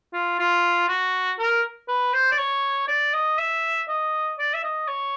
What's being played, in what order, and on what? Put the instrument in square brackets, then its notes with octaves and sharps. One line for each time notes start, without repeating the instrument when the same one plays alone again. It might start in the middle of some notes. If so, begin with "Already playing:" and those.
[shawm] F4
F4
F#4
A#4
B4
C5
D5
C#5
D5
D#5
E5
D#5
D5
E5
D#5
C#5